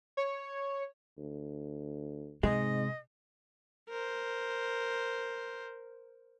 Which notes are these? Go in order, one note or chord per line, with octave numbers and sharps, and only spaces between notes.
C#5
D2
G#2 C3 G#3 D#5
A#4 C5